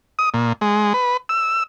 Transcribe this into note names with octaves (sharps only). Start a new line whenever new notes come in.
D#6
A#2
G#3
B4
E6